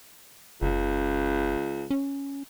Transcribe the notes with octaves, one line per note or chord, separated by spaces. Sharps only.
F#1 C#2
C#4